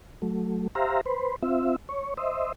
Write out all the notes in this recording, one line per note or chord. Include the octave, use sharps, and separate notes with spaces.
F#3 A3
G4 C5 E5 F5 A#5
B4 C5
C4 F4 E5
C#5
C5 D#5 E5